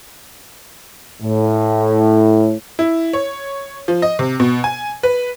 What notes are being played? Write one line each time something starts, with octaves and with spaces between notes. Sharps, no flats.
A2
E4
C#5
F3
D#5
C3
B2
G#5
B4